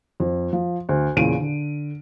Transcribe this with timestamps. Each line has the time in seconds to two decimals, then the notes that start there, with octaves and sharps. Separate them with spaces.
0.20 F2
0.53 F3
0.89 D2
1.16 E2 A#2 C#3 D7 D#7
1.40 D3